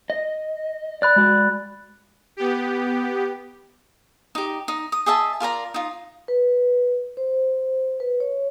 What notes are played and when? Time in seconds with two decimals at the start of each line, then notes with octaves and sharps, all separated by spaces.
0.10 D#5
1.02 D5 B5 F#6 A6
1.16 G#3 F#4 D5
2.37 B3 G4
4.35 D#4 G4
4.68 D#4
4.92 D#6
5.06 G#4 D#5 E5 A5
5.40 F4 A#4 D5 A#5
5.74 D#4 F4
6.28 B4
7.17 C5
8.00 B4
8.20 C#5